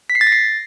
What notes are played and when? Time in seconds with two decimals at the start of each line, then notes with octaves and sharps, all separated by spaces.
0.10 B6
0.15 C7
0.21 A6
0.27 A#6
0.32 C7